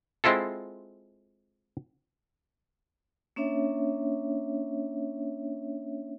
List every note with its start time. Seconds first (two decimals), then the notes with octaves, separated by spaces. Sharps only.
0.24 G#3 C4 E4 F4 A4
3.36 A#3 C#4 D4 C#5 E5